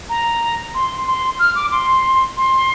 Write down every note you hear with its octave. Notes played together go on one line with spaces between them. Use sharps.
A#5
C6
C6
F6
D6
C6
C6